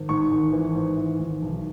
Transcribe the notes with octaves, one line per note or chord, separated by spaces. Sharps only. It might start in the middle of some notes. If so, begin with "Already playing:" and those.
Already playing: G#1
G#2 C#6
G#1
E3
G#2
E3
G#1
B1